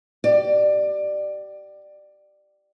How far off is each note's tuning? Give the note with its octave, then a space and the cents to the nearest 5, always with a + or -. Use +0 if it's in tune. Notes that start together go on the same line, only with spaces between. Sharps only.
G4 -30 D5 +20